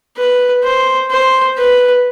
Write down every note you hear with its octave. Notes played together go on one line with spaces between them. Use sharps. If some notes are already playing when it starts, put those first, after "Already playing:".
B4
C5
C5
B4